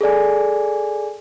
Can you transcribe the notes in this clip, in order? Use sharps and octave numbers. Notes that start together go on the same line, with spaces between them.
G#4 A4 D5 G#5